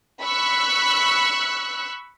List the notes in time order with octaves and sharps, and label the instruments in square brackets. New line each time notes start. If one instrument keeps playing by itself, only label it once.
[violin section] B5 C#6 E6 F#6